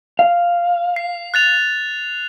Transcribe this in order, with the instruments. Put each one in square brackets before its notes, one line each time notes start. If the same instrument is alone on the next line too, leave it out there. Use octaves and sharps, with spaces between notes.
[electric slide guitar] F5
[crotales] C7
F#6 A6 F7